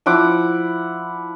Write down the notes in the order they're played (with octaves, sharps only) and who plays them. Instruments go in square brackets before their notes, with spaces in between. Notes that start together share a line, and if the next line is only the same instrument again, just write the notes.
[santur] F3 E4 F#5 D6